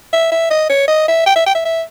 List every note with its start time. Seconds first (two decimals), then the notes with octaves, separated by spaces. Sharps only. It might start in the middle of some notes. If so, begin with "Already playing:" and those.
0.13 E5
0.32 E5
0.50 D#5
0.69 C#5
0.88 D#5
1.08 E5
1.26 G5
1.36 E5
1.46 G5
1.55 E5
1.65 E5